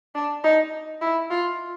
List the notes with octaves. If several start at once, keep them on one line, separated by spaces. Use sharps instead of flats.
D4
D#4
E4
F4